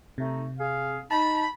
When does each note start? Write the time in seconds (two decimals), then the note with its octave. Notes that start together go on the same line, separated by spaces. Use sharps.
0.18 C3 A3 D#4
0.59 G#4 F5
1.11 D#4 A5 B5